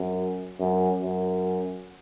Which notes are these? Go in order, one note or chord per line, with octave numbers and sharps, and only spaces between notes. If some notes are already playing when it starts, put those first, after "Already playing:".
Already playing: F#2
F#2
F#2